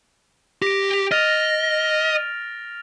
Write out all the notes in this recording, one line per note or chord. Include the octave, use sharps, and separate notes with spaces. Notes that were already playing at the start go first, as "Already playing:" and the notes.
G4 A#6 D7
D#5 F6 A6 F7